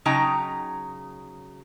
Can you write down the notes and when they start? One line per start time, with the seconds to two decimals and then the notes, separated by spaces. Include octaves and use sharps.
0.06 C#3 F#3 D#4 G5 A#5